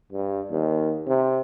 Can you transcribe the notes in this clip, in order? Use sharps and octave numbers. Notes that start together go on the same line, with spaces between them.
G2
D#2
C3